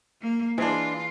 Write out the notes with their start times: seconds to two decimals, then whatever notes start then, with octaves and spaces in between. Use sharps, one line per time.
0.22 A#3
0.58 E3 G#3 D4 F4 G#4